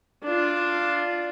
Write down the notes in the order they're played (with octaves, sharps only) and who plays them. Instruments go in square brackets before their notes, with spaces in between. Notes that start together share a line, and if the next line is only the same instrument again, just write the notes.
[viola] D4 F4